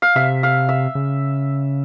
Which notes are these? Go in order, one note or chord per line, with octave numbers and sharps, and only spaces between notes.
F5
C3 E5
F5
E5
C#3